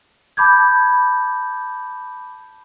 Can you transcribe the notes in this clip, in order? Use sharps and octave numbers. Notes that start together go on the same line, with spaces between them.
A5 B5 D6 G6 G#6